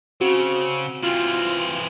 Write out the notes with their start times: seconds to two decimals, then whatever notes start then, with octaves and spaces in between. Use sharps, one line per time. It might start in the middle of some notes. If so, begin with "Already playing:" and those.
0.21 C#3 C4 F#4
1.03 E3 C4 F4